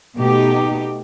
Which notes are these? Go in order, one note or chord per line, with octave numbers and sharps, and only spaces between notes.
B2 A3 D#4 G4